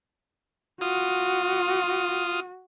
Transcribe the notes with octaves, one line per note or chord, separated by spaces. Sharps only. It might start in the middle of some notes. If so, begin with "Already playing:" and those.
F4 F#4 D#6